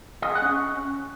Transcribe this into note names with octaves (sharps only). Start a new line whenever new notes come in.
D#5
G#4
F#5
C#4